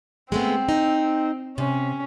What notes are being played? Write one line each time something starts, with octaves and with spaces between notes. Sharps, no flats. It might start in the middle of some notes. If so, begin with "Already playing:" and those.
G#3 A3 B3 C4
D#4
C3 C#4